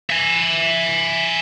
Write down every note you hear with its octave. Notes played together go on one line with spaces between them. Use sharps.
E5 G#5